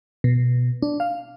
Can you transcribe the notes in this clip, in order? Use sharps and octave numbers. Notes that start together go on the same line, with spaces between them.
B2
D4
F5